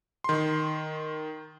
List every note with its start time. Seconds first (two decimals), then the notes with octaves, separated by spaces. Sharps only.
0.24 D#3 C6